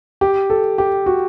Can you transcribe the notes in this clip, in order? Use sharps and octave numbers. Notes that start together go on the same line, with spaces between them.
G4
A4
G4
F#4